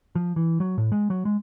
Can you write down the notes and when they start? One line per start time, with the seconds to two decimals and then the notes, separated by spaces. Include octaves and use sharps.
0.15 F3
0.36 E3
0.60 F#3
0.78 A2
0.92 G#3
1.10 F#3
1.25 G#3